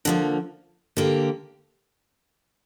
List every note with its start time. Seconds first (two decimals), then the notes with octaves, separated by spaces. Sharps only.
0.05 D3 F3 A#3
0.97 D3 A#3 G4